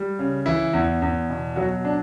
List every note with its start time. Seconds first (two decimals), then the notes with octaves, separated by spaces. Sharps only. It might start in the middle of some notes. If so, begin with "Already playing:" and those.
Already playing: G3
0.19 C#3
0.46 E3 E4
0.73 E2
1.02 E2
1.29 B2
1.56 F#3 F#4
1.85 D4